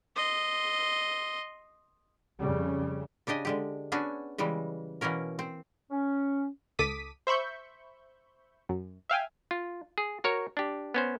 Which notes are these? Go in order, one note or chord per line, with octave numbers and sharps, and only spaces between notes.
D#5 C6
F2 C#3 G3
C#3 D4 G4 D#5 G#5
D3 G#3 G4
B3 C#4 D4 F#4 G#4
C#3 E3 G3 G#3
B2 E3 A#3 C#4 A#4
C4
C#4
C#2 A4 D6 D#6 B6 D#7
C5 E5 B5 C#6 G6
F#2
E5 F5 G5 G#5
F4
G#4
F#4 A#4 C#5
D4 G4
B3 C#4 C5